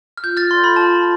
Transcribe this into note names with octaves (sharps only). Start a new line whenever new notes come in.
F6
F4 G6
F6 A6
A4 D5 F5 C6
B5
F4 A5